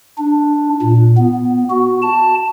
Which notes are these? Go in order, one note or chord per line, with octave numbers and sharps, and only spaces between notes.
D4
A#2
B3
F#4
A5